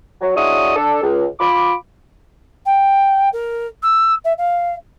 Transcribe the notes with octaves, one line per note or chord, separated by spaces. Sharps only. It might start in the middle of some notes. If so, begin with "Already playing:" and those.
F#3
G#3 D4 E4 F#4 C#5 D#6
D4 A4
C#2
F4 B5 D6
G5
A#4
E6
E5
F5